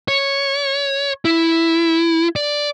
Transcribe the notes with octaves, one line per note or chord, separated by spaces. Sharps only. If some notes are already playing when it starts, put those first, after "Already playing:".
C#5
E4
D5